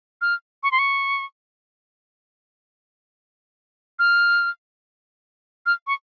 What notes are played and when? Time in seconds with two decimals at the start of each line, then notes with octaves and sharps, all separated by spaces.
0.21 F6
0.63 C#6
0.71 C6
0.79 C#6
3.99 F6
5.66 F6
5.87 C#6